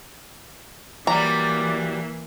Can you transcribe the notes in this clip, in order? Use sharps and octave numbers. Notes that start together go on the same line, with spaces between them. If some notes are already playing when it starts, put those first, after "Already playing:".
E3 F#3 G3 A#3 D5 A#5